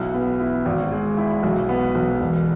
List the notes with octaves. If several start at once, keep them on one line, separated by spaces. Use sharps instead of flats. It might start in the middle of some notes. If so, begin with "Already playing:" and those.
Already playing: B1 E4
B3
E4
G#1
G#3
E4
B1
B3
B1
E1